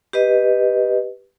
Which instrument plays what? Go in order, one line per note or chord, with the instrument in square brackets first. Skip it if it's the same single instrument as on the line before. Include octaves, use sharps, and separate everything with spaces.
[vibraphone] G4 B4 D#5